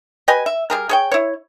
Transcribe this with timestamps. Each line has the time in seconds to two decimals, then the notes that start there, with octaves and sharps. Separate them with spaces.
0.28 G4 B4 D#5 G#5
0.46 E5
0.70 G3 G#4 A#4
0.89 G#4 C#5 G5
1.12 E4 C#5